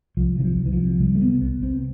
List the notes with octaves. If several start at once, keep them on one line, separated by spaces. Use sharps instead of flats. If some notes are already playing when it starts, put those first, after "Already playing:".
C2 F3
C3 E3
F3
C2
E3
F3
C3
C3 G3
A3
C3 B3
C2 B3
C2 C4